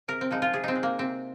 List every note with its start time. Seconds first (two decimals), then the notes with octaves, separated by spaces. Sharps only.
0.08 C3 A#4
0.21 C4
0.31 F3 G#3 D#4
0.42 F4
0.53 C3 G#4
0.64 C4 D#4
0.75 G#3
0.83 A#3
0.98 C3 C4